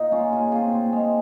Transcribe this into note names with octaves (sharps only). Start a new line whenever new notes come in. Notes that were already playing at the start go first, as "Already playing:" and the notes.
Already playing: A#2 D#4
G#3 C#4 F4
A#2 F4 G#4
C4 F4 G#4
A#2
G#3